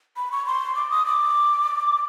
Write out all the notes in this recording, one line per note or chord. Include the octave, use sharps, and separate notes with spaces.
B5
C#6
C6
D6
D#6
D6